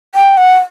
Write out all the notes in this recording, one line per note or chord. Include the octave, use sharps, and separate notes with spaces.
G5
F#5